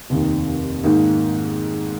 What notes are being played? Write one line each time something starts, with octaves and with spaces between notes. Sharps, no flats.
F1 D#2 D#3
G#2 D#3 A#3 D#4